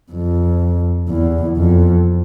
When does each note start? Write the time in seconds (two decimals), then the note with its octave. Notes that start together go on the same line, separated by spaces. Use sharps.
0.12 F2
1.09 E2
1.57 F2